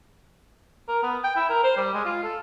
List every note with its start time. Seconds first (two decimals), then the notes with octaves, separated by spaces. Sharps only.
0.88 A#4
1.03 B3
1.24 G5
1.36 E4
1.49 A#4
1.63 C5
1.77 G3
1.93 G#3
2.05 F4
2.23 A4